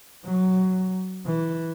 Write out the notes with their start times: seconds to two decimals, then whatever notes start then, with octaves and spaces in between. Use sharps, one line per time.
0.24 F#3
1.26 E3